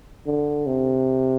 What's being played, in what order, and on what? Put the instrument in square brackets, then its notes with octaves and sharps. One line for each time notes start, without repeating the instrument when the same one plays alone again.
[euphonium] D3
C3